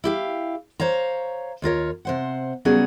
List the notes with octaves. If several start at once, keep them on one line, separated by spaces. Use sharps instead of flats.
E4 G4 F5
C5 C#5 F5 A#5
D#2 F4 A#4 C#5
C3 C5 F#5
C#3 F#3 G3 B3 C#4 G#4